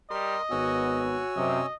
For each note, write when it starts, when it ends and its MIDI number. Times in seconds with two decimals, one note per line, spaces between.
0.11 0.36 55
0.11 0.42 70
0.11 1.07 75
0.11 0.42 84
0.51 1.22 32
0.51 1.22 59
0.51 1.67 66
0.51 1.66 73
0.51 1.66 80
0.51 1.66 88
1.37 1.63 42
1.37 1.63 48
1.37 1.74 75